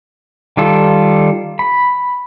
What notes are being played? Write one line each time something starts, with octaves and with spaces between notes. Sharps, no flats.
D#3 G3 F4 A4
B5